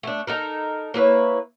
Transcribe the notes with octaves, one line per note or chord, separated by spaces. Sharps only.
A3 D4
D#4 A4 A#4
A#3 E4 B4 C#5